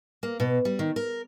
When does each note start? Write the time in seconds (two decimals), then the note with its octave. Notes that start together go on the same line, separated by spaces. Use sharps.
0.23 A#3
0.40 B2
0.65 G3
0.79 D#3
0.96 A#4